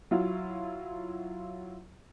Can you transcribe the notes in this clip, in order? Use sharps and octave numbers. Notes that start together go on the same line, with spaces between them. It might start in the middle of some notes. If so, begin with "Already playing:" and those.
F#3 E4 F4